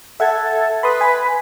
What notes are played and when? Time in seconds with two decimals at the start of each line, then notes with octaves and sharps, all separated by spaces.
0.20 A4 E5 F#5 G#6
0.83 B4 B5 C6 D#6
1.01 G#5